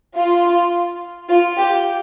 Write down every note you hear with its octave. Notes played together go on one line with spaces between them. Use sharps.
F4
F4
G4